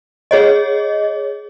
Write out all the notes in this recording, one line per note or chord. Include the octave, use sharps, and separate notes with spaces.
G#4 C#5 D#5